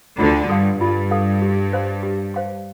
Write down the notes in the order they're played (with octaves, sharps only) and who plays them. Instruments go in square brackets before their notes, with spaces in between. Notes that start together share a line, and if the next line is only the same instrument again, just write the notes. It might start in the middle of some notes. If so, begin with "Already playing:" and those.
[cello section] D2 D3 [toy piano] F4
[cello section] G2 [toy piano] A4 F5
[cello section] G2 [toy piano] F4
[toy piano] A4 F5
G4
C5 F5 C6
G4
C5 F5 C6